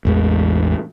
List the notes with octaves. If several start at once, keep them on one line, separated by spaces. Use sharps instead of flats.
A1 E2 G#3